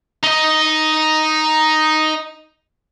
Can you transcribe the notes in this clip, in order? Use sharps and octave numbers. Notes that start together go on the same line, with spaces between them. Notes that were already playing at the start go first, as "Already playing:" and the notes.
D#4 D#5